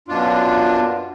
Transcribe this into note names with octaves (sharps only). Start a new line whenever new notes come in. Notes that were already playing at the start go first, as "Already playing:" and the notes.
F#2 B2 D4 F4